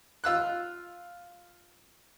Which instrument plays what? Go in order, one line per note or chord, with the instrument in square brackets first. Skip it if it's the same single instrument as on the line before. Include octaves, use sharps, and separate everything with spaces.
[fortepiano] F4 E6 F#6